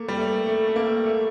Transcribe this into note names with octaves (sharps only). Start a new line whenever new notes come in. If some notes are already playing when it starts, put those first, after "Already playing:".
Already playing: A3 A#3
G3
A3
A3
A3
A#3
A3